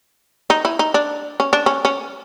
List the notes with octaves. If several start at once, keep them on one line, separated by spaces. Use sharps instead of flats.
D#4
E4
D#4
D4
C#4
D4
C#4
C#4